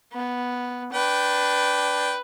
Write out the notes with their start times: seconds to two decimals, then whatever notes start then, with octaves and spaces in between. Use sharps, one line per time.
0.13 B3
0.93 D4 B4 G5